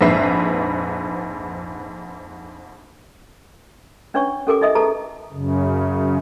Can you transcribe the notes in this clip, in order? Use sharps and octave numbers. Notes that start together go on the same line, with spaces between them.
A#1 F2 G#2 B4 E5 C7
C#4 D4 B4 C#5 C#6
C#4 G4 A4 A#4 G#5 D6
D#4 E4 D#5 E5 D#6
G#4 A4 B4 A5 A#5
F#2 C#3